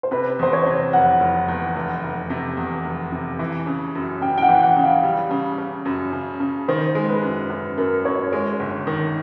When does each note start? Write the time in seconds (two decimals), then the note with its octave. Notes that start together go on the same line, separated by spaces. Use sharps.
0.03 C5
0.11 C3 B4
0.39 E2 C5
0.53 C#5
0.66 C3
0.93 F1 F#5
1.20 F1
1.48 E2
1.76 F1
2.03 F1
2.30 C3
2.57 E2
2.85 F1
3.12 C3
3.39 E3
3.66 C#3
3.95 F#2
4.21 C#3 G5
4.38 G5
4.42 F#5
4.49 E3
4.63 F#5
4.77 C#3
4.83 F5
5.03 G3
5.31 C#3
5.58 C#3
5.85 F#2
6.13 C#3
6.40 C#3
6.68 D#3 C5
6.95 G#3
7.09 B4
7.22 F#2
7.50 F#2 B4
7.78 F#2 A#4
8.05 F#2 C#5
8.32 G#3 C#5
8.60 G1
8.87 D#3